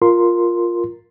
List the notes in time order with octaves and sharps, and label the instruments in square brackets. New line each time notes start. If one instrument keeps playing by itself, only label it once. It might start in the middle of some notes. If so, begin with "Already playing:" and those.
[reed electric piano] F4 A#4 C6